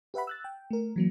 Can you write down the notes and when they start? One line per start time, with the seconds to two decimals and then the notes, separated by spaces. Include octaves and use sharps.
0.14 G4 B4 E5 F#5 B5
0.27 E6 F#6 A6
0.44 G5
0.71 A3 A#4
0.96 E3 F#3 A#3